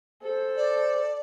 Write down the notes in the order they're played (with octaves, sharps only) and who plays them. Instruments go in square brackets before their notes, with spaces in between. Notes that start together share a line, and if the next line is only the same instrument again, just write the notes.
[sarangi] A4 [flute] C5
[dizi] D5